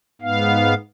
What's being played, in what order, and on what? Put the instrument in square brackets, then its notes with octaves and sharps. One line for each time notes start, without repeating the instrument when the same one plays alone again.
[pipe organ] G#2 B3 F5